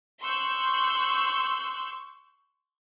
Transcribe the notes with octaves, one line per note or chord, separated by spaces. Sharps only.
C6 C#6 E6 F#6 G6